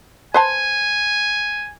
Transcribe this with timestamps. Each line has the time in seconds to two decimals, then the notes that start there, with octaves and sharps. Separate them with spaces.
0.34 B4 C5 G#5 A5